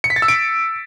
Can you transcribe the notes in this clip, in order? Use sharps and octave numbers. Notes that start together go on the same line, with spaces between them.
C#7
B6
A6
E6
D7